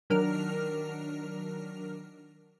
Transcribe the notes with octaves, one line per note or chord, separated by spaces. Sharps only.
D#3 F#3 D4 A#4 F6 F7